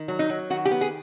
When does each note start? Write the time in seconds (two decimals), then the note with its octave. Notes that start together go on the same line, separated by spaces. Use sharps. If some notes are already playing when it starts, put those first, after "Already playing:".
Already playing: D#3
0.08 F#3
0.19 D#4
0.29 F#3
0.50 D#3 F#4
0.65 G4
0.71 B3
0.81 G#4